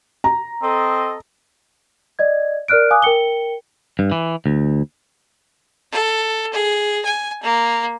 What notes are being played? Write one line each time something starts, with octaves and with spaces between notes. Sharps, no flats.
A#5
C4 A4 D#5
D5 D#5 G#6
A#4 D5 F6 F#6 D7
F5 G#5 D6 D#6 F#6
A#4 G5 C#7 G7
G2
E3
D2
A4
G#4
G#5
A#3